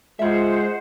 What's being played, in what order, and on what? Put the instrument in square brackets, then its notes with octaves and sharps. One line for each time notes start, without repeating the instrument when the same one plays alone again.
[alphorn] G#3 [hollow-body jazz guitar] F4 E5 [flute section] C5 F#5